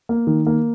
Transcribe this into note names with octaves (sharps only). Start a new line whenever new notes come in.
A#3
D#3
A#3